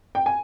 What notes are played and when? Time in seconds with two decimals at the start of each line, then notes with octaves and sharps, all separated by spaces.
0.15 G5
0.26 G#5